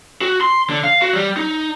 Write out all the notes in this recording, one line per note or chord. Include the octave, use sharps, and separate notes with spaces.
F#4
C6
D3
F5
F#4
G3
D#4